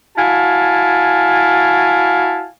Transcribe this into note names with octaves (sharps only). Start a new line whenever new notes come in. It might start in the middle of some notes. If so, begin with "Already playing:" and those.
E4 F#4 F5 G#5 A5